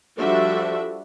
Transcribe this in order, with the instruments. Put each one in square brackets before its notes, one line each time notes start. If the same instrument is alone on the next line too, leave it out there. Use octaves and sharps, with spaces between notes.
[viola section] F3 G3 D4 F#4 A4 E5